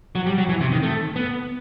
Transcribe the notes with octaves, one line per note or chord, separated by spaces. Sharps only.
F#3
G3
F#3
E3
C3
D#3
A3
B3